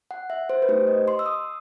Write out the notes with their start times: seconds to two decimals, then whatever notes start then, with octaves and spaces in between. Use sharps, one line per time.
0.11 F#5
0.30 E5
0.50 C5
0.62 B4
0.68 A3 D#4 G4 C5
0.87 D#5
1.08 C6
1.19 E6
1.26 D#6